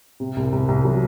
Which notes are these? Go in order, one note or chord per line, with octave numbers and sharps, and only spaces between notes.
C3
C2
C2
C2
F#3